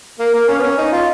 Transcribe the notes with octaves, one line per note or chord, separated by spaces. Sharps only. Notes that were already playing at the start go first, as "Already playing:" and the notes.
A#3
A#3
C#4
B3
C#4
D#4
F4